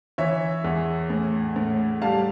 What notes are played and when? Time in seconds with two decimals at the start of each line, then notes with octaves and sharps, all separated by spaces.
0.18 E3 C#5 E5
0.64 E2
1.10 A2
1.56 A2
2.02 G3 F5 A5